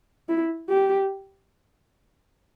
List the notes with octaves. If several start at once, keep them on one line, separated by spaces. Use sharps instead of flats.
E4
G4